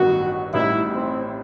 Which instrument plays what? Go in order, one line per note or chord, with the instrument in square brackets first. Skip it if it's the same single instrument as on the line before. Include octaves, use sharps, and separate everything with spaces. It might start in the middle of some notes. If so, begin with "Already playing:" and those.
Already playing: [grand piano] A1 G2 D#3 F#3 B3 [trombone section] F#4
[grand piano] A1 A2 G3 D#4 [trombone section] E4
[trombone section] C4